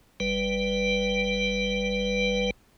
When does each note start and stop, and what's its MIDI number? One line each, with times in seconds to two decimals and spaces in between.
0.20 2.51 31
0.20 2.51 55
0.20 2.51 71